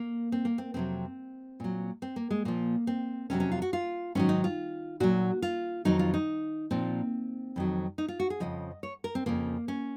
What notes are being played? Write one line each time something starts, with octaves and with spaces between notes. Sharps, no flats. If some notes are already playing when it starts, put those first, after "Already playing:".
Already playing: A#3
C4
A#3
C4
F2 C3 D#3 F#3 C4
A#2 F#3
C4
A#3
G#3
A#2 F3 A#3
C4
F2 C3 D#3 F#3 C#4
C#4
F4
F#4
F4
G#2 D#3 F#3 C#4
D#4
F4
A#2 F#3 F#4
F4
F2 D#3 F#3 D#4
F4
D#4
A#2 F3 C4
F2 D#3 F#3
D#4
F4
F#4
G#4
F2 C#3 F3 D#5
C#5
A#4
C4
F2 C#3 F3 A#3
C#4